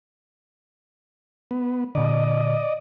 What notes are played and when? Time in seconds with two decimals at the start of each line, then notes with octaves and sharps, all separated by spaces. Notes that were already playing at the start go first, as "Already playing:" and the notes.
1.51 B3
1.95 A#2 D3 D5 D#5